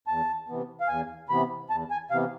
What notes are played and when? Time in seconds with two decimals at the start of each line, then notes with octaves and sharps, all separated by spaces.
0.08 E2 A5
0.49 C3 E3 B3
0.81 F5
0.88 E2 G#5
1.29 C3 E3 B3 B5
1.70 E2 A5
1.91 G#5
2.11 C3 E3 B3 F5